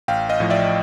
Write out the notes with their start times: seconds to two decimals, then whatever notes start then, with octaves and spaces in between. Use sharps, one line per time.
0.08 A1 F5 G5
0.29 D#5 F5
0.40 A2 F3
0.50 D5 E5